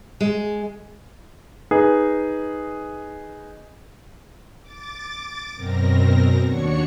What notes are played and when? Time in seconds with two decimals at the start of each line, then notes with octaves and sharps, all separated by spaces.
0.21 G#3
1.71 D#4 G#4 B4 D#5
4.62 D6 A6
5.55 F#2 B2 C4 A#4 A#6
6.43 D#2 D4 F#4 C#5 C#6 C#7